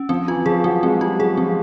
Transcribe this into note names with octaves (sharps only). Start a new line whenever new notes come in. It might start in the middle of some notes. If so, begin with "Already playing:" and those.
Already playing: C#4
F3 C4
E3 F4
F3 G#4
F#3 C4
G#3 C4
G3 F4
F#3 G#4
F3 C4